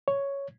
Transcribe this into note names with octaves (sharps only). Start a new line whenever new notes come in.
C#5